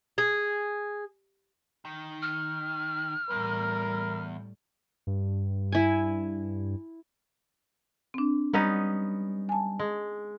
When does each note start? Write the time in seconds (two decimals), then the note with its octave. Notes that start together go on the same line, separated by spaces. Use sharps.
0.18 G#4
1.85 D#3
2.22 F6
3.31 E2 A2 G3 A#4
5.07 G2
5.72 E4 G#5
8.14 C4 D4
8.54 G3 B3 C#4 D#4
9.49 G#5 A5
9.79 G#3